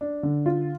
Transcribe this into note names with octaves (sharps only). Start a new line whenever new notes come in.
D4
D3
F4